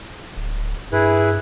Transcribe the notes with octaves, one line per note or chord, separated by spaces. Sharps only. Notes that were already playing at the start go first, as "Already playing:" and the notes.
D1
G2 E4 G#4 B4